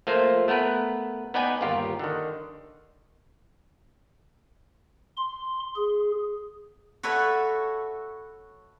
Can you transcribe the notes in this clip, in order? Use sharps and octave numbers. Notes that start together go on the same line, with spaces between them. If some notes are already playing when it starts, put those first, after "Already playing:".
F3 A3 A#3 F4 C5
A3 B3 A#4 B4
B3 D#4 B4 D5 G5 G#5
G1 D#2 F4 G4 A#4
D3 D#3
C6
G#4
F#4 A4 B4 C#5 E5